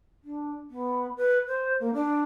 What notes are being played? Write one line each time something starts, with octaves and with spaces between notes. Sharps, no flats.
D4
B3
B4
C5
A#3
D4